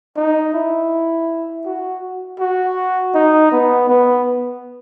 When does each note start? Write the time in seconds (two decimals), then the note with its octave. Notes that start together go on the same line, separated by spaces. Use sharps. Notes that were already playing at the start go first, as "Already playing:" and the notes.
0.17 D#4
0.54 E4
1.66 F#4
2.40 F#4
3.15 D#4
3.52 B3
3.89 B3